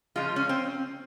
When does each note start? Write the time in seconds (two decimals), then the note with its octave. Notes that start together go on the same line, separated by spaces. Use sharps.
0.16 C#3 F3 G#3 F4
0.36 C#4
0.49 C4